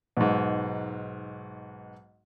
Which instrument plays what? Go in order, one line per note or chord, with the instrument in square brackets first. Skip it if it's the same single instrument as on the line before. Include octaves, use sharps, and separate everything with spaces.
[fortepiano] B1 G#2